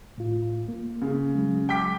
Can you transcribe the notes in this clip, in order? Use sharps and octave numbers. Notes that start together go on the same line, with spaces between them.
A2 F4
A#3
C#3
F#3 G#3
G5 D6 B6